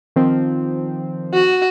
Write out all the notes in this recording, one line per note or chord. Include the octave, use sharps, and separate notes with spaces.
D#3 F3 C4
F#4